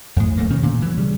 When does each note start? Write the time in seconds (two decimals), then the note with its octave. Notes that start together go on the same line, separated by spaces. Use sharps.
0.16 F2 A2
0.38 D1 F2 A3 A#3
0.50 B2 D#3 C#4
0.63 A#2 D3
0.82 E3 F#3
0.98 C#3 G3